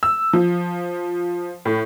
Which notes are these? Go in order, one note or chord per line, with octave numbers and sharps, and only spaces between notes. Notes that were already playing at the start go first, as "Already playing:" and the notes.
E6
F3
A2